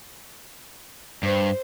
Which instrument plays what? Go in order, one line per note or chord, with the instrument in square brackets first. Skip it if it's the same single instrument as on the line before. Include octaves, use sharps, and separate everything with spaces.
[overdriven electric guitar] G2 [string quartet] C5